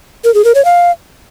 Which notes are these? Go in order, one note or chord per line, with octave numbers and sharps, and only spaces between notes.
A#4
G#4
A#4
C#5
F5